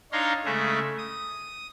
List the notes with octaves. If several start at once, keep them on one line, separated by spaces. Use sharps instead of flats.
D4 D#4 C#5 F5 A#5 C6
C#3 G#3 A3 E5
D#6